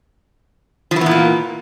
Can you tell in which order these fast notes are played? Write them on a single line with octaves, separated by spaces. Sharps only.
F3 E3 B3 A#2 A#3